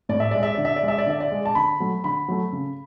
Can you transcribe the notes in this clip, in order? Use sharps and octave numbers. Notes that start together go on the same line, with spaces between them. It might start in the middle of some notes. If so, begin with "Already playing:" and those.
A2 D5
E5
G#3 D5
E5
D3 D5
E5
D5
G#3
E5
D5
D3 E5
D5
G#3
A5
D3 B5
F#3 A3
D3 B5
F#3 A3
C#3